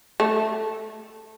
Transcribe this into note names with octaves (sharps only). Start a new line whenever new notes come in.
A3